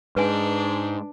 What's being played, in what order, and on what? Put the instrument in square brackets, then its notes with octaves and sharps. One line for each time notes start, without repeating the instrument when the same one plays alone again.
[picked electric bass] G#2 [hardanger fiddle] D4 [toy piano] B4 G#5